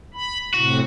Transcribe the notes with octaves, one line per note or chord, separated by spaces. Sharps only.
B5
A2 C3 F#4